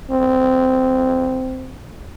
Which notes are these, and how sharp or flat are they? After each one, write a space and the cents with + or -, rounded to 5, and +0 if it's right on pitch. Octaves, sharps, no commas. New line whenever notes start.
C4 -15